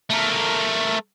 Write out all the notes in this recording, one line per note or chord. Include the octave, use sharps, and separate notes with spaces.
A3 A#4